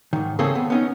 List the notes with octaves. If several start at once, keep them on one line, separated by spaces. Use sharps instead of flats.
G#2 D#3
C#3 A#3 C4 G#4 A4
B3
B3 C#4 D#4